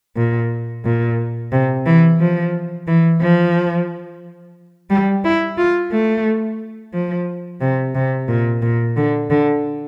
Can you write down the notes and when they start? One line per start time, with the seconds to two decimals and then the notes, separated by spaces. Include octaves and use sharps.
0.16 A#2
0.84 A#2
1.52 C3
1.86 E3
2.20 F3
2.87 E3
3.21 F3
4.90 G3
5.24 E4
5.58 F4
5.91 A3
6.93 F3
7.61 C3
7.95 C3
8.28 A#2
8.62 A#2
8.96 D3
9.30 D3